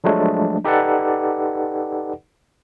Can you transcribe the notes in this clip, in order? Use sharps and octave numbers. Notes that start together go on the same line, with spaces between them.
F3 F#3 G#3 A3 D4
D#4 G4 A4 B4 D5 F#5